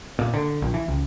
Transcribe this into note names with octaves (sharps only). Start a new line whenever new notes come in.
A#2
D3
A#1
E3
C#2